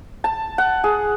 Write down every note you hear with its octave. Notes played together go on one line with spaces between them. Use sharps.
A5
F#5
G#4